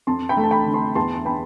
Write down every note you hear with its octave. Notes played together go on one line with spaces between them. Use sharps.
F2 A5 C6
G5 B5
A3
A5
G5 B5
D3
A5 C6
E2 A5 C6
C6
B3 G5 B5